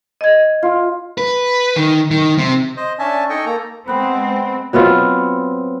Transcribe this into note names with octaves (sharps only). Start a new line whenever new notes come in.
D#5 G#6
F4
B4
D#3
D#3
C3
C5 D#5
C#4 D4 E5 G#5 A5
D#4 A4 D#5 G5 G#5 C#6
A#3 A4 A#5
G#3 B3 C4 B4
F#3 B3 C4 F4